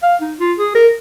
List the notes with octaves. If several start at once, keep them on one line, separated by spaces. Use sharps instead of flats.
F5
D#4
F4
G#4
A#4